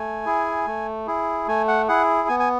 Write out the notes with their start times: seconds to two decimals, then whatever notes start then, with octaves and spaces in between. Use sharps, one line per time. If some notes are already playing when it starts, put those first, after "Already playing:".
Already playing: A3 G#5
0.26 E4 G#4
0.67 A3
1.07 E4 G#4
1.47 A3 G#5
1.68 F#5
1.88 E4 G#4 F#5
2.28 B3 G#5
2.40 G#5